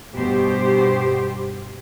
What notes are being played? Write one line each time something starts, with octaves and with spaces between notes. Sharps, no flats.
G2 B2 G4 C5